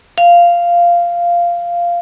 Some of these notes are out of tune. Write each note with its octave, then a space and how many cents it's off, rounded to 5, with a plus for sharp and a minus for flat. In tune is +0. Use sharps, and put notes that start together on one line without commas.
F5 -10